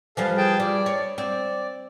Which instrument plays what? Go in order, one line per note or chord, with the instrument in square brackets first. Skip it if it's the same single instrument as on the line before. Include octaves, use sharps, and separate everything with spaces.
[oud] E3 F3 G3 [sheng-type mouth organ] A4 F5
[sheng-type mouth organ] G#4 G5 A5
[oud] G3 [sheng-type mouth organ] D5
[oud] C#5
[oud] C4 [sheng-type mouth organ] D5